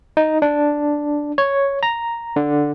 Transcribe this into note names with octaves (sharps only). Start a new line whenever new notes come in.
D#4
D4
C#5
A#5
D3